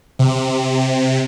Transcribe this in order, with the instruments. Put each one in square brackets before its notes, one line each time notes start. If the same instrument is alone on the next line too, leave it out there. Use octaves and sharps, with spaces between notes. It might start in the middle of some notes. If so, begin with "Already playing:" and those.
[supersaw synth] C3